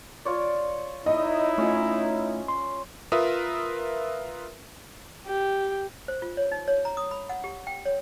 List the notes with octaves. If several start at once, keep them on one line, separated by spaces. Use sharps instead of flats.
F4 C#5 D5
D#4 E4 D#5
A3 C#4 F4
C6
F4 A#4 B4 E5 D#6
G4
C5
F4
C#5
D#4
C#5
A#5
D#6
B5
F#5
G4
G5
C#5